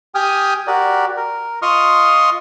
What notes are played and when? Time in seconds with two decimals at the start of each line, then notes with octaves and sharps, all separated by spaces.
0.15 G4 G5 G#5 D#6 F6
0.67 F#4 G4 A#4 D5
1.17 A#4
1.62 F4 D#5 C6 C#6 D#6 F6